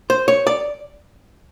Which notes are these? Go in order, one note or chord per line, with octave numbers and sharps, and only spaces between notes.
C5
C#5
D5